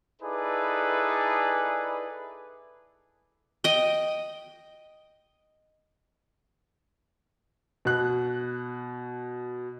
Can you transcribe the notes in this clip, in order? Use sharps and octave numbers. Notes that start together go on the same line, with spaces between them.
D#4 E4 G#4 A4 B4 D5
D#5 G5
B2 F#6